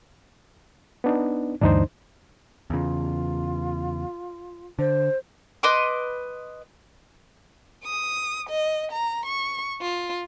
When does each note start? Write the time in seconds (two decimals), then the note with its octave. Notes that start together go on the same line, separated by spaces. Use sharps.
1.04 B3 D4 D#4
1.62 D2 G2 E3 D4 D#4 C5
2.70 E2 C#3 F4
4.79 D3 C5
5.63 B4 D#5 C6 D6
7.84 D#6
8.49 D#5
8.92 A#5
9.26 C#6
9.81 F4